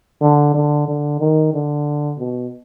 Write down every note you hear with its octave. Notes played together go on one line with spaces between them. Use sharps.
D3
D3
D3
D#3
D3
B2